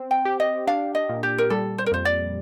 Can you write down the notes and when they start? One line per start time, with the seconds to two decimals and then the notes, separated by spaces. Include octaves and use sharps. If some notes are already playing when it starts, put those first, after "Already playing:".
Already playing: C4
0.11 G5
0.25 G4
0.40 D#5
0.67 D4 F5
0.95 D#5
1.09 A#2
1.23 G4
1.38 A#4
1.50 G3 A4
1.78 C5
1.86 A#4
1.92 F2 C5
2.05 D5